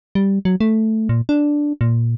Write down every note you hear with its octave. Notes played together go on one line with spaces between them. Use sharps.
G3
F#3
A3
A#2
D4
A#2